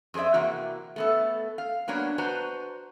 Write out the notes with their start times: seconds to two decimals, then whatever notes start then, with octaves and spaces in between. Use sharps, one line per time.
0.14 F2 G#4 C5 D5 E5
0.34 C3 E3 A#3 F#4
0.96 A3 B3 A4
1.58 F5
1.88 F#3 A#3 B3 D4 C#5
2.18 F#4 B4 C5 A5 A#5